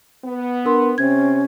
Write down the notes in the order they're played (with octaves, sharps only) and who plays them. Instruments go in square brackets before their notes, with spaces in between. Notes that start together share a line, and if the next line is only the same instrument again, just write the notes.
[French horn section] B3
[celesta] D4 A#4 C6
[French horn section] C3 C4 [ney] C#4 [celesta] G#6